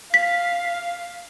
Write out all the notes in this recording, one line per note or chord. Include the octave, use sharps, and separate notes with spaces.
F5 B6